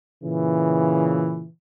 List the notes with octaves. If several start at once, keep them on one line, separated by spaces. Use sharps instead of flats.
A#2 C#3 E3